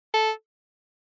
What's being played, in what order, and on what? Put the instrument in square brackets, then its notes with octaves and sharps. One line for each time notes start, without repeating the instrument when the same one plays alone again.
[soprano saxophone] A4